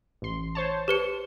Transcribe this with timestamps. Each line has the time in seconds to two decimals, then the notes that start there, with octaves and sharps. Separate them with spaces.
0.22 A1 C6
0.55 C5 C#5 A5
0.88 G4 B4 C#7